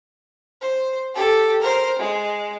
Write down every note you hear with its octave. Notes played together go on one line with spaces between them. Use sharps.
C5
G4 A4
A#4 C5
G#3